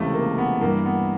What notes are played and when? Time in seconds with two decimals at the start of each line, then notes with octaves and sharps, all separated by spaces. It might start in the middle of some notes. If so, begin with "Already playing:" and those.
Already playing: C#2 C3 E3 A3
0.14 A#3
0.38 B3
0.61 G2 E3 A#3
0.85 B3